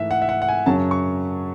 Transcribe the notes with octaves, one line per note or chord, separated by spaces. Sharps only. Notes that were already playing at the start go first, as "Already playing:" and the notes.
Already playing: G#2 E3 A3 E5
F#5
E5
F#5
F#5
G#5
F#2 C#3 F#3 C#4 A5
C#6